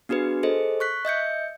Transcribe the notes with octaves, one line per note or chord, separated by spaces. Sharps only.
B3 D4 F#4 G#4 B4
G#4 A4 C5 D#5
C#6 F#6 B6
D#5 E5 G6 C#7